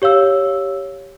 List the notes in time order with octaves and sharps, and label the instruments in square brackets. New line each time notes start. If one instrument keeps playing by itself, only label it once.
[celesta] G4 C#5 F5 E6